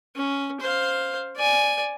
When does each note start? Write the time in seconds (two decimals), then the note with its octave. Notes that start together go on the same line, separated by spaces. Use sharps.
0.16 C#4
0.61 C5 F5
1.36 D5 G#5